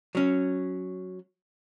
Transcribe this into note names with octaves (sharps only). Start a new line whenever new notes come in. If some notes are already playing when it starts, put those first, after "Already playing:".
F#3 C#4